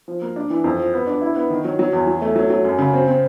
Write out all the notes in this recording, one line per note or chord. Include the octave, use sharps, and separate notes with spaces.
F3
A#3
D4
E3
F2
F3
B3
D4
E4
B3
D#3
F#3
F#3
E2
F#3
A3
F#3
F#3
F#2
C#3
C4
C4